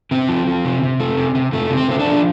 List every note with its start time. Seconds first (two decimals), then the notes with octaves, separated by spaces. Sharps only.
0.11 C3 C4
0.29 F3
0.47 F3
0.65 C3
0.83 C3
1.00 A3
1.17 C3
1.35 C3
1.52 C3 A3
1.70 C3
1.77 C4
1.89 A3 C4
2.00 D4
2.06 F3